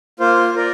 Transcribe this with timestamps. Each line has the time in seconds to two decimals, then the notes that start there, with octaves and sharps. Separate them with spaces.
0.20 A#3 F4 C5
0.54 F4 A#4 D5